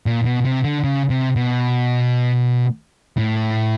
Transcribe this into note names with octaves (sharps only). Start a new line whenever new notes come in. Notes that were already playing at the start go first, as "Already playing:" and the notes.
A#2
B2
C3
D3
C#3
C3
B2
A2